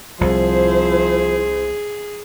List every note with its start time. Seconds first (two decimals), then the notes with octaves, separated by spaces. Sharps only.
0.21 C2 F3 E4 G#4 C5